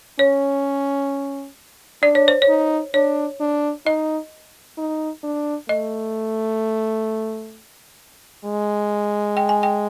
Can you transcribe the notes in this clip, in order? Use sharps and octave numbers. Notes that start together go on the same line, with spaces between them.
C#4 C#5
D4 D5
C#5
C5
C#5
D#4
D4 C#5
D4
D#4 D#5
D#4
D4
A3 D#5
G#3
G5
G#5
G5